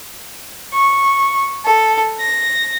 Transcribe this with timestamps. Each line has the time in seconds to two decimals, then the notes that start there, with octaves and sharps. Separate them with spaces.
0.73 C#6
1.65 A4
2.20 A#6